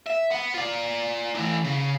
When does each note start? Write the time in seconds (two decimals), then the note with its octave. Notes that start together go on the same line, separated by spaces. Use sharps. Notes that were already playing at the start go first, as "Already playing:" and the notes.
0.07 E5
0.31 B3
0.55 F4 D5
1.35 A2 E3
1.64 C#3